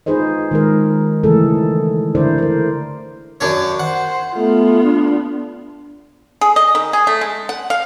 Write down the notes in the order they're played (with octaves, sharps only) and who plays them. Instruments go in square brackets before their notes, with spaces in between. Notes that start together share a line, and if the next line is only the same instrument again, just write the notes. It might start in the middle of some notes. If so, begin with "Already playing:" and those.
[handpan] D#4 F4 G#4 B4 C5 D#5
D#3 G#3 A#4
C#3 E3 A3 G#4 A4
D3 E4 A#4 C5 D5
A#4 C5
[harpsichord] F#2 D4 C#5
[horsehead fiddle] C5 [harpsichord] F#5
[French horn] A3 [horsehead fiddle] B3 F4
[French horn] D4
[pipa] G#4
D#5
D#3
G#4
A3
G#3
F#5
F5